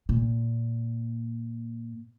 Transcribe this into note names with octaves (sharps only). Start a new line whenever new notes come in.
A#2